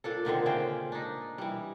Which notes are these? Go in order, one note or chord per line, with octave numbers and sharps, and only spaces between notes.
A#2 D4 A4
A#2 D3 D#3 C4
C#3 C#4 C5 G5
D4 D#4
E3 G3